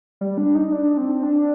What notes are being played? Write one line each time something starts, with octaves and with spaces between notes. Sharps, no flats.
G3
D4
D#4
D4
C4
D4